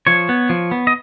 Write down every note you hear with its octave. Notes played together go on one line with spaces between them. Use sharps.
F3 C#5
B3
F3
B3
D#5